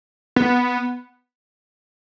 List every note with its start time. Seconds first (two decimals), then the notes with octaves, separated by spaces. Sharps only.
0.36 B3